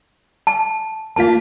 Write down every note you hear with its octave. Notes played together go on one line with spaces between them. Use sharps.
A5
A3 A#3 F4 F5 A5